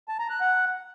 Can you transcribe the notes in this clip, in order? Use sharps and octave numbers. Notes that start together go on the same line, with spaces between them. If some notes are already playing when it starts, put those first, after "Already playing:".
A5
A#5
F#6
F#5